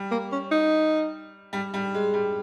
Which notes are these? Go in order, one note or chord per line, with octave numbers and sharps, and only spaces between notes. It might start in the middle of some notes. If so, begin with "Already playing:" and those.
Already playing: G3
A#3
C#4
D#4
G3
G3
G#3
G3